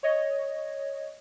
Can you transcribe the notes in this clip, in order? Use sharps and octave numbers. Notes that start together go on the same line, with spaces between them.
C#5 D#5